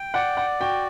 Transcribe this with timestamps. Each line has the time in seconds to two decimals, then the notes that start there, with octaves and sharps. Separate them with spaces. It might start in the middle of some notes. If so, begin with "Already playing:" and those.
Already playing: G5
0.14 D5 F#5
0.37 F#5
0.61 F#4 G5